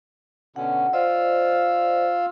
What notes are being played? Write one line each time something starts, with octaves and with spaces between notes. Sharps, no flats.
B2 D3 C#4 F#5
F4 C5 D5 D#5 F5 E6